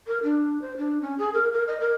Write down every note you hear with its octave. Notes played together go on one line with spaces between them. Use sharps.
A#4
D4
C5
D4
C#4
G#4
A#4
A#4
D#5
A#4